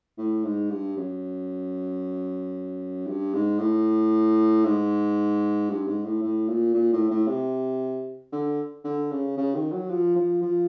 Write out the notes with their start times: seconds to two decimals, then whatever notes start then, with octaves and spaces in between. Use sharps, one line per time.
0.18 A2
0.45 G#2
0.71 G2
0.97 F#2
3.07 G2
3.34 G#2
3.59 A2
4.65 G#2
5.70 G2
5.87 G#2
6.05 A2
6.23 A2
6.49 A#2
6.74 A#2
6.93 A2
7.11 A2
7.28 C3
8.33 D3
8.85 D3
9.12 C#3
9.37 C#3
9.55 D#3
9.72 F#3
9.90 F3
10.16 F3
10.42 F3